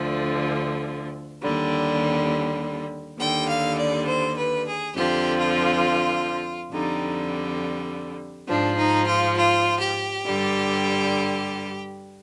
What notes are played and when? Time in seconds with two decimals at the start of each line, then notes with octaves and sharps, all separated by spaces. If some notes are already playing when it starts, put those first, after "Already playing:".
Already playing: D2 D3 F3
1.42 D#2 D3 G3
3.19 D#2 D3 G3 G5
3.49 F5
3.77 D5
4.06 C5
4.36 B4
4.66 G#4
4.94 F2 D3 F3 G4
5.38 F4
6.71 F2 D3 G3 D#4
8.47 G#2 F3 D4
8.77 D#4
9.06 F4
9.36 F4
9.80 G4
10.24 G2 D3 G3